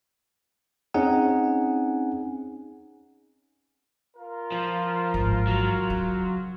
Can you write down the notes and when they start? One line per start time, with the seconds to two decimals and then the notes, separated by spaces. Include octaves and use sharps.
0.94 C4 C#4 D#4 G#4 F#5 G#5
4.17 F4 A#4
4.52 F3
5.14 G#1 E3
5.47 F#3
5.90 C#3